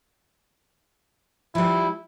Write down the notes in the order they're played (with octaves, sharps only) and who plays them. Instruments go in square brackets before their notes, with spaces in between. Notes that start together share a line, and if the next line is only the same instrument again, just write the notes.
[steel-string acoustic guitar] F3 G3 [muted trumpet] E4